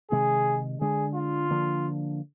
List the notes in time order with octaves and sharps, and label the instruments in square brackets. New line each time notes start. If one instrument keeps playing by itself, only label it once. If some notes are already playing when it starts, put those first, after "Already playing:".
[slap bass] C3 D#3 G#3 [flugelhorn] G#4
[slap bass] D3 G#3 D4 [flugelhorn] G#4
[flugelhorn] F4
[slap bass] D3 F3 A#3 D4